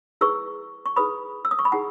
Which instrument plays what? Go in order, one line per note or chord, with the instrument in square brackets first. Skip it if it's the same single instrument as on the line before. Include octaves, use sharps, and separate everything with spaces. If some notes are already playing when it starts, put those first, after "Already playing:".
[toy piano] E4 G#4 B4 C#6 E6
C#6
E4 G#4 B4 B5 D#6
E6
D#6
C#6
B5
E4 G#4 F#5 A5